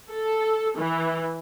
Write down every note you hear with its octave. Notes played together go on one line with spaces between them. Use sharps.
A4
E3